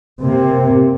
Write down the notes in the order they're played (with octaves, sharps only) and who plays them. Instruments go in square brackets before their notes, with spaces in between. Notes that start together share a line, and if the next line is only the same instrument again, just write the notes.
[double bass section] C3 A#3